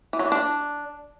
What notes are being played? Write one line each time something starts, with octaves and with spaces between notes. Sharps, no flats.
E3
F#3
E3
D4